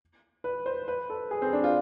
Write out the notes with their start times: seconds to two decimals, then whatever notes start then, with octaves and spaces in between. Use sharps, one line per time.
0.44 B4
0.66 C5
0.88 B4
1.10 A4
1.31 G#4
1.42 C4
1.53 D4
1.64 F4